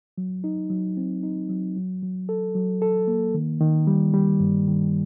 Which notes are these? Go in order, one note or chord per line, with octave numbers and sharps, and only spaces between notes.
F#3
D#4
F#3
C4
D#4
F#3
F#3
F#3
A4
F#3
A4
A#3
D#3
D#3
G3
G3
G2
D#3